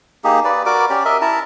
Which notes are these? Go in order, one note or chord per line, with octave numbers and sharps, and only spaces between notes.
A#3 D#4 G4 G#4
B4 D5
F#4 A#4 D5 D6
C#4 G4 D5
A#4 D#5 E5
E4 A5 A#5